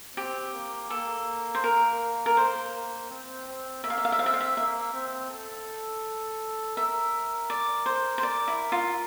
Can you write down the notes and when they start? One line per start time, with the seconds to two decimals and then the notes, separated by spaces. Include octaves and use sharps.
0.17 C4 G4
0.54 A#3
0.90 A#3 A4
1.55 C5
1.64 A#4
2.26 A#4
2.37 C5
3.10 C4
3.47 C4
3.84 A#3 E5
3.90 F5
3.98 E5
4.05 F5
4.12 E5
4.19 C4 F5
4.26 E5
4.34 F5
4.40 E5
4.57 A#3 E5
4.93 C4
5.31 A4
6.77 A#4 E5
7.50 D5
7.86 C5
8.18 C5
8.23 D5
8.48 E4
8.72 F4